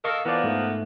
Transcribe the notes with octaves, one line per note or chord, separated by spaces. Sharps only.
A4 A#4 D#5 F5 C#6
E3 F3 A#3 B3 D5
G#2 A3